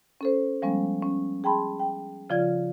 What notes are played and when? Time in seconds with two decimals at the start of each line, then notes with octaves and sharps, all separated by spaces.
0.21 C#4 A4 C5
0.62 F3 G3 G#3 B3 C#4
1.02 C#4
1.44 G#4 G5 A5 B5 C6
1.80 G5
2.30 C#3 F3 F4 D5 G#6